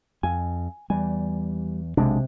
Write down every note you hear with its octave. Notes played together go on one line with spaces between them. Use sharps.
F2 G#5
E2 G3 G#5
B1 C3 G#3 D4